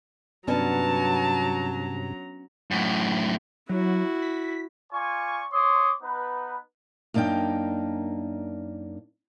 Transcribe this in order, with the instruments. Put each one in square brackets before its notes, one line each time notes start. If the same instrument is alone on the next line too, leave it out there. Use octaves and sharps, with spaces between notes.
[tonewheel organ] G2 C3 [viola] F#3 A#5 [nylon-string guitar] B3 C#4 D4 [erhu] A5
[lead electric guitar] F#2 A2
[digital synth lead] F#3 [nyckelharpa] E4 F#4
[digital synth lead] B6
[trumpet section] F4 D5 G#5 C#6
C5 C#5 C6 D6 D#6
B3 D#4 B4
[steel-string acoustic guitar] F#2 A#3 D4 D#4 G5